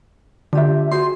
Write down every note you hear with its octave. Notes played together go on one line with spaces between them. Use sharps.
D3 F4 G4 E5
F#4 G#4 C5 C6